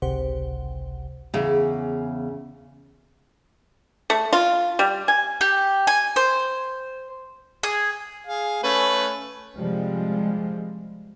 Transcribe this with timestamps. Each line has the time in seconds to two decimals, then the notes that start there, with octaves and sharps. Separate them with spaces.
0.02 G#1 C#2 C3 G4 C5 F#5
1.34 E2 C#3
4.10 A3
4.33 F4
4.79 G3
5.08 G#5
5.41 G4
5.87 G#5
6.16 C5
7.63 G#4
8.27 G#4 F5
8.63 A3 C#4 B4
9.57 C3 F3 G3 G#3